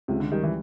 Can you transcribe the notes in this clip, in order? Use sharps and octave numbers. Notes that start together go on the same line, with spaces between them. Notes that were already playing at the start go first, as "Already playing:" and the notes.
C#2 C3
D3
D#3 G3
E3